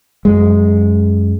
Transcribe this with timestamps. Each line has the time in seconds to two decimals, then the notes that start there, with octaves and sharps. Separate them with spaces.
0.25 F#2 G#3